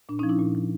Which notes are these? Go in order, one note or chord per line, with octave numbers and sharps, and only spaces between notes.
A#2 D4
C#4 D#4
F3
D4 E4
A#2
F3